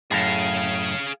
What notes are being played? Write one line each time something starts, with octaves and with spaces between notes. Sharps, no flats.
F#2 A2 G#4 F5